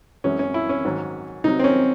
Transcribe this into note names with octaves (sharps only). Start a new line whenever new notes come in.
F#2 E3 G#3 C#4
C#4
E4
C#4
G#2 D#3 F#3
C3 F#3 D#4
C4
C#4